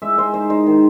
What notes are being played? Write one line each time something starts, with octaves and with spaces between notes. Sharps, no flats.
G#3 E5
G#3 C5
D#4 C5
D#4 C5
D#3